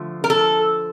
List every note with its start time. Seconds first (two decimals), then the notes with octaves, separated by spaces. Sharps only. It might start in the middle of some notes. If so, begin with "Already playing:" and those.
Already playing: D3 F3 A3
0.24 A#4
0.30 A4